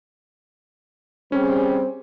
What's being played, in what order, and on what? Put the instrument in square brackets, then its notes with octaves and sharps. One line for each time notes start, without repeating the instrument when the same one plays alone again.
[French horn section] G3 G#4 [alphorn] C4 [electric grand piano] C#4